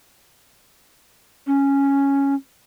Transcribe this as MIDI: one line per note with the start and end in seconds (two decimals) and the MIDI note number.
1.47 2.34 61